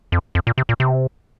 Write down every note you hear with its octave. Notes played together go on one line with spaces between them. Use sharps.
F2
F2
A#2
C3
A#2
C3